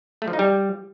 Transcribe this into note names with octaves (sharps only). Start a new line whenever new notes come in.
A3
F3
D#4
G3